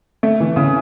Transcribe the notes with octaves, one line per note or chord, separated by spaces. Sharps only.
A3
E3
C#3